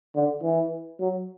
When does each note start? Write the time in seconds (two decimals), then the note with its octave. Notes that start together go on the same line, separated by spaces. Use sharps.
0.16 D3
0.43 E3
1.00 F#3